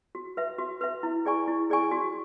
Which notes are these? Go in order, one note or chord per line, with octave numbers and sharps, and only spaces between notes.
F#4
B4 E5
F#4
B4 E5
E4
G#4 D5 G#5 C#6
E4
G#4 D5 G#5 C#6
F#4